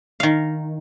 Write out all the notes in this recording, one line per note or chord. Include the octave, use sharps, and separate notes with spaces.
D#3 F5